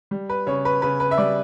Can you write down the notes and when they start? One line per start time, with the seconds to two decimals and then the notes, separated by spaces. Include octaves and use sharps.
0.11 G3
0.30 B4
0.47 C#3 C#5
0.65 B4
0.82 C#3 B4
1.00 B4
1.11 E5
1.18 G3 D5